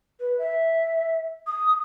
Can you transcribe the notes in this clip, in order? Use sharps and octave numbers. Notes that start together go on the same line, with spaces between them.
B4
E5
D#6